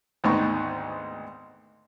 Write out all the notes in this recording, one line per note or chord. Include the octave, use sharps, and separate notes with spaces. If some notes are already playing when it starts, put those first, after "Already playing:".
G#1 D2 B3 D#4 D#5 C#6